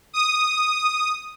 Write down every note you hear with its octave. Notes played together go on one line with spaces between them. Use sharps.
D#6